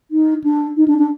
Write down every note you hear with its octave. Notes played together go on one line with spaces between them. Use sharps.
D#4
D4
D#4
D4
D4